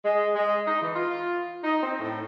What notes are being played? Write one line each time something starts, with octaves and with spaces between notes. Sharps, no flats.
G#3
G#3
D#4
E3
F4
D#4
C4
A2